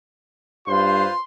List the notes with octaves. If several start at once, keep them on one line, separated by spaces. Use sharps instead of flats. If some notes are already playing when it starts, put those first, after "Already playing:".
G2 F4 B4 C5 C6